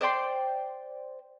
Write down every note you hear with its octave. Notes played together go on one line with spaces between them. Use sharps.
C5 D5 G5 C6